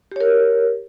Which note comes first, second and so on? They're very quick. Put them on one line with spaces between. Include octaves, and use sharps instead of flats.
G4 C#5 A#4